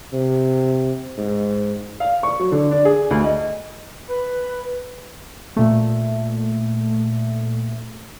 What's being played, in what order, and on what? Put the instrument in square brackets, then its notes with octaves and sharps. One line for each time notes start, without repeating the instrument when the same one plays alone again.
[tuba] C3
G#2
[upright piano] F5
C#6
F#3
D3
D4
G#4
D2
D#5
[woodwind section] B4
[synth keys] A#2 A3